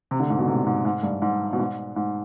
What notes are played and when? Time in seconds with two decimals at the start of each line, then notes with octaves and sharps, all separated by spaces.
0.11 C3
0.20 D3
0.30 G#2
0.39 B2
0.48 C3
0.66 G#2
0.85 G#2
1.03 G2
1.22 G#2
1.53 B2
1.59 G#2
1.96 G#2